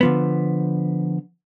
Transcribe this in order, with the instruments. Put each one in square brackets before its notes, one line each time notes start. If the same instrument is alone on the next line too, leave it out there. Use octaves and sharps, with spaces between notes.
[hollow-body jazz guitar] D3 F3 B3